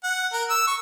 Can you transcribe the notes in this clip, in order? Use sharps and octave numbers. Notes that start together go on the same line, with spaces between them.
F#5
A#4
E6
C#6